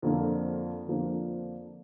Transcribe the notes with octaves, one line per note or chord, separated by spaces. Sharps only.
F2 D3 F3 A#3 D4
F2 D3 F3 A#3 D4